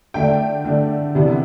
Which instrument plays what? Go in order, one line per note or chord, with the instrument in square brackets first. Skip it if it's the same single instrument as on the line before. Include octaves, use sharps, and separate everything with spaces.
[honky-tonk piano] D3 A3 D4 G5
D3 A3 D4
C3 E3 B3 D4